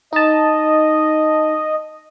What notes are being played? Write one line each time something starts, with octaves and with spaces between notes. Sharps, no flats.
D#4 D#5 A5